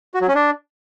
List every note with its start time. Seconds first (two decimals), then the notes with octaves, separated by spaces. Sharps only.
0.14 F#4
0.21 F#3
0.28 C#4
0.35 D4